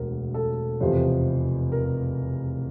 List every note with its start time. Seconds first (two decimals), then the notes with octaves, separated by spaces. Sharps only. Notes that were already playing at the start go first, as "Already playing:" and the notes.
Already playing: E1 D2 A#4
0.34 A4
0.80 F1 E2 C3 F3 C5
1.72 A#4